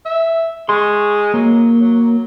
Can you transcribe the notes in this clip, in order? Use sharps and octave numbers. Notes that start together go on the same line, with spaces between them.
E5
G#3 C6 C#6
F#3 A#3
F#3